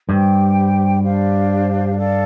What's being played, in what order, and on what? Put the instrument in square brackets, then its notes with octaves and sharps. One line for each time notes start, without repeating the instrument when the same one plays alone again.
[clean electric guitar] G2 [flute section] G4 C5 G5
[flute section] D4 G4 C5 F5
A4 D5 F5